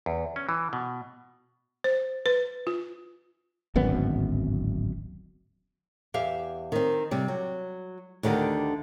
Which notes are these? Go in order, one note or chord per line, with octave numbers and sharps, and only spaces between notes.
E2
C#4
E3
B2
C5
B4
F4
D1 G#1 F#2 B3
E2 G4 E5 F5
D#3 C4
C3 G3
F#3
D2 D3 D#3 G4